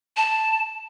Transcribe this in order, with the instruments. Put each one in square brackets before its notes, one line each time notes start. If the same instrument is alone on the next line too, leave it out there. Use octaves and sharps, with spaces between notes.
[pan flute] A5